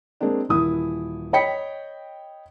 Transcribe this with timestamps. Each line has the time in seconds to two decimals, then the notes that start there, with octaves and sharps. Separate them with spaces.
0.21 G#3 A#3 C4 D4
0.49 D#1 E3 E4 D#6
1.33 C#5 D#5 G5 B5 B6 C#7